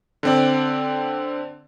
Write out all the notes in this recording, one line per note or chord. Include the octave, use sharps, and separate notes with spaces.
D3 C4 D5